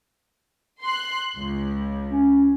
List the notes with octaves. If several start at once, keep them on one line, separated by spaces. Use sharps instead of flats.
C6 F#6
C#2
C#4